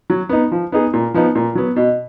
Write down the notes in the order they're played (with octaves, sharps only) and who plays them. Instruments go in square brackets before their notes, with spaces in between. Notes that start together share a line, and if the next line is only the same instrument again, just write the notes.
[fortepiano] F#3
B3 D#4
F3
B3 D#4 G#4
A#2
F3 B3 D#4
A#2
F#3 B3
B2